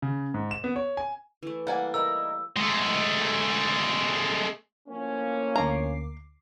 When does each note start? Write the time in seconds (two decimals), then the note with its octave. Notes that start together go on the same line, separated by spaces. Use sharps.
0.02 C#3
0.34 G#2
0.51 E7
0.64 B3
0.76 C#5
0.97 G#5
1.43 E3 A3
1.67 G3 A#3 F#5 G#5
1.94 D#4 E4 A#4 E6
2.56 G#3 A3
4.89 A2 F3 A#3 C#4
5.56 D2 A#5 D6 C7